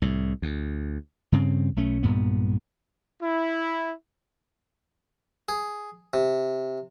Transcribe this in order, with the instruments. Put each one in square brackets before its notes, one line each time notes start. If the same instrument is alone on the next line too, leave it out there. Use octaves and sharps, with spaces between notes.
[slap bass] C2 A2
D2
G2 C#3 C4
B1 A3 C#4
B1 G2 A#2 B3
[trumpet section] E4
[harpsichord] G#4
C3